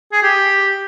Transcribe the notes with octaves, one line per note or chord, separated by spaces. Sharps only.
G#4
G4